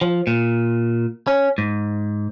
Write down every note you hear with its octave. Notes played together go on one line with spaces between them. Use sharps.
F3
A#2
C#4
G#2